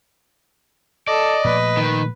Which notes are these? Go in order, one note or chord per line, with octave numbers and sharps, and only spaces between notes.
A4 D5 D#5
A#2 F3 A3 B4
D#3